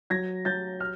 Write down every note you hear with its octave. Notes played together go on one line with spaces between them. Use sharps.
F#3 G#6 A#6
F#3 G6 A6
F6